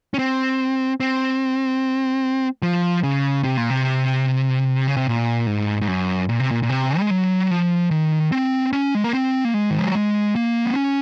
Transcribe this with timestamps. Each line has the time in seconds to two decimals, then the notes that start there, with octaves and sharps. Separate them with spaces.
0.14 C#4
0.19 C4
1.00 C4
2.62 F3
3.03 C#3
3.44 C3
3.57 A#2
3.70 C3
4.87 C#3
4.97 C3
5.07 A#2
5.47 G#2
5.81 G#2
5.88 F#2
6.29 A#2
6.40 C3
6.51 A#2
6.63 A#2
6.69 C3
6.99 G#3
7.11 F#3
7.51 F3
7.91 D#3
8.32 C4
8.73 C#4
8.95 G#3
9.04 A#3
9.13 C4
9.45 A#3
9.54 G#3
9.71 D#3
9.79 F3
9.87 F#3
9.95 G#3
10.35 A#3
10.65 C4
10.76 C#4